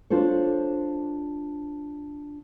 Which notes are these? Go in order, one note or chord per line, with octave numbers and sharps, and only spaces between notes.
D4 F4 A4 C5 C#5